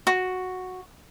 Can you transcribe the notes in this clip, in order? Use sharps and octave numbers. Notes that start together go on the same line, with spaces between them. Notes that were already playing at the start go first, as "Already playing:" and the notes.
F#4